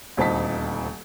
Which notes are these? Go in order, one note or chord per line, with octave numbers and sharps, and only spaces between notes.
D#1 D2 C4 D#4 A5 B6